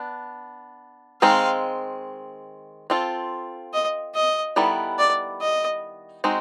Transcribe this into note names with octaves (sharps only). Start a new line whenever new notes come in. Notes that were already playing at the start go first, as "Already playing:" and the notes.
Already playing: B3 D4
D#3 G#3 C4 F5
C4 F4 A4
D#5
D#5
D#3 G3 B3 E4 A4
D5
D#5
G#3 C4 D#4 F#4